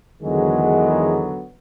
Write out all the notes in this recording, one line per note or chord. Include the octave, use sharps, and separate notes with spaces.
E2 D3 D#3 F#3 G#3 B3